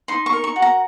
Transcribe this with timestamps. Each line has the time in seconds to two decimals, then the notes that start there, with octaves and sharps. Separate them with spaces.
0.08 D#4 C6
0.26 C#6
0.33 A#4
0.44 C#6
0.56 F#4
0.62 A#5